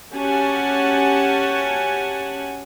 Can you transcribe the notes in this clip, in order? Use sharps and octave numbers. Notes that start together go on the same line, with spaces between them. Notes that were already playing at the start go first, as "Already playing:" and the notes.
C#4 F#4 G4 F#5 G#5 A5